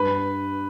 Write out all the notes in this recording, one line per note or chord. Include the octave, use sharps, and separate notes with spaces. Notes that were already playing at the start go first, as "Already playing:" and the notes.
Already playing: G2 B4